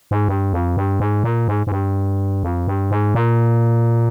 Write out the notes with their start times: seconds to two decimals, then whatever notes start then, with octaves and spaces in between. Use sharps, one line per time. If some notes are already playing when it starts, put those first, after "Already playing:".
0.11 G#2
0.29 G2
0.53 F2
0.77 G2
1.00 G#2
1.24 A#2
1.48 G#2
1.67 G#2
1.72 G2
2.44 F2
2.67 G2
2.91 G#2
3.15 A#2